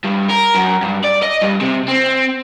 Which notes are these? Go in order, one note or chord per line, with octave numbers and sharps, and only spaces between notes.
G2
A#4
F#2
G2
D5
D#5
G2
C3
C4